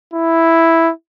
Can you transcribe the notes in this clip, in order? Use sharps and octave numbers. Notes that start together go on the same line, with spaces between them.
E4